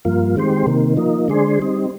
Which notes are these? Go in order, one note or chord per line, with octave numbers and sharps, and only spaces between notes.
G2 F3 A#3 F4
D#3 G#3 C4 G4 C5
C3 D#3 A#3
F3 A#3 D#4
D3 G#3 D4 G#4 C5
G3 C4 D#4